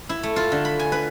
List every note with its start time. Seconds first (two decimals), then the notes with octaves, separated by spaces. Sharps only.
0.09 E4
0.23 A3
0.36 F4
0.52 D3
0.65 B5
0.79 G#5
0.92 B4